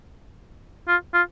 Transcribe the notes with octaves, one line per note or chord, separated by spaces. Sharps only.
F4
F4